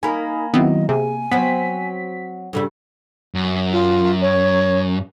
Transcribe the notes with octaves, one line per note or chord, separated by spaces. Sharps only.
A#3 D#4 A#4 G#5 A#5 B5
D#3 F#3 B3 C4 E4 D#5
C3 G#4 G#5
F#3 B3 C4 B6
G2 C#3 G3 A4
F#2
F4
C#5